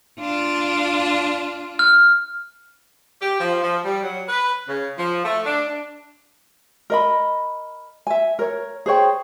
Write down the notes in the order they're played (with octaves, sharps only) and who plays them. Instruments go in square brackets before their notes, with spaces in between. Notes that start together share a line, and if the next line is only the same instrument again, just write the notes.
[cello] D4 F4
[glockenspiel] F6
[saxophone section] G4
F3
F3
G3
F#3
B4
C#3
F3
A3
D4
D4
[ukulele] A#4 D#5 B5
E5 G#5
A#4 C#5
G#4 C5 C#5 G5